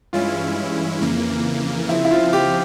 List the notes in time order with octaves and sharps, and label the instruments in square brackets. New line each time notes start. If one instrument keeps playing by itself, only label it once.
[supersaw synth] G2 E3 G#3 C#4 E4 [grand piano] F4
[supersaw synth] F2 C#3 E3 A#3
[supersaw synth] C#3 F3 C4 [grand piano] E4
[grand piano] E4
F4
G4